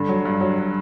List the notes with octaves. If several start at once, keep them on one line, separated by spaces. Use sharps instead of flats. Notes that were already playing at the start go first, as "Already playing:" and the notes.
Already playing: G2 D3
F#3
G2
F#3